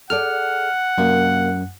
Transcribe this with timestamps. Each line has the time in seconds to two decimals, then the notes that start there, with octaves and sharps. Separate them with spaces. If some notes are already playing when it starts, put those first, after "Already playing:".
0.10 G#4 A4 D5 F#5 F6
0.98 F#2 C3 A#3